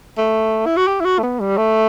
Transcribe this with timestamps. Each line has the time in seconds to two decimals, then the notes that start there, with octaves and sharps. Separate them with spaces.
0.17 A3
0.66 E4
0.77 F#4
0.87 G4
1.00 E4
1.05 F#4
1.19 A3
1.23 B3
1.40 G3
1.58 A3